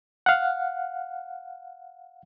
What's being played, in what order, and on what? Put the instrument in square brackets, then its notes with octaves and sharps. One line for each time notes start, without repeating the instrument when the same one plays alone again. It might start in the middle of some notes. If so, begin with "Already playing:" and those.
[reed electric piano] F5 F#5